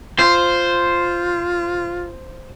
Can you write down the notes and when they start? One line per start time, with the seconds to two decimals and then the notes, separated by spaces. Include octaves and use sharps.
0.19 F4 C5